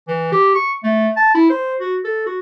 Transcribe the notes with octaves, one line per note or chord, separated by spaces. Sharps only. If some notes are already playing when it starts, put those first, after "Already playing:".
E3
G4
C#6
A3
A5
E4
C5
F#4
A4
F#4